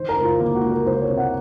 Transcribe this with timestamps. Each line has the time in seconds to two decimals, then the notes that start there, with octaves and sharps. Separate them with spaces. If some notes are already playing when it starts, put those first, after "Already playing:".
Already playing: D#3 C5
0.09 A#4
0.16 C#2
0.24 F4
0.40 D#3 A#3
0.55 F#4
0.63 C#2
0.71 A#4
0.86 C#2 C5
1.02 C#5
1.10 C3
1.17 F#5